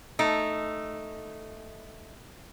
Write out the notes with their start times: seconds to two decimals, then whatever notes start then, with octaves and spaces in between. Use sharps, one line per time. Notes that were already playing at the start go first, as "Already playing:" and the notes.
0.19 A3 D#4